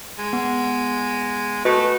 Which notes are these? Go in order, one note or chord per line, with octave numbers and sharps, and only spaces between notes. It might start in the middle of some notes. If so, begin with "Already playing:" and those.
G#3
B3
A3 F#4 B4 D#5